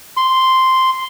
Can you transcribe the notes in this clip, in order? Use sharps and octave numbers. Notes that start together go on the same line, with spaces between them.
C6